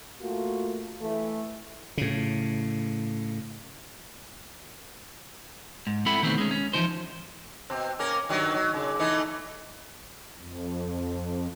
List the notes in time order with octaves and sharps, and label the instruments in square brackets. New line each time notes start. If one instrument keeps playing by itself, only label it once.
[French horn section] A3 A#3 F4 F#4
E3 A3
[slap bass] A2 C#3
[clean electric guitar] G#2
C4 E4 A4 E5 F#5 B5
B2 D#3 E3 A3 C4
G#3 C#4
C#4
E3 F3 D#4 C5
[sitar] B2 C4
A#3 C#4 A#4
G2 D#3 F#3
F#3
A#2 C#3
E3 A3 D#4
[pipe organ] F2